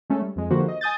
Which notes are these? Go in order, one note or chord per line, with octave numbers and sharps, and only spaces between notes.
G#3 A3 C#4 A4
G3
F2 G#3
D3 F3 A#3 F#4 G4 C5
D#5
G#5 D#6 G6 A6